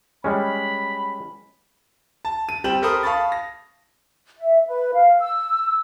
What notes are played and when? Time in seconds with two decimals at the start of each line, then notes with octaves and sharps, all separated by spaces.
0.24 G3 G#3 C#4 B5
2.25 A5
2.49 D#7
2.64 G3 C4 G5 E7 F#7
2.82 G4 A4 A#4 C5 B5 D#6
3.03 F5 A5 B5 C#6 D#6 A6
3.32 A#6
4.38 E5
4.66 B4
4.93 F5
5.19 E6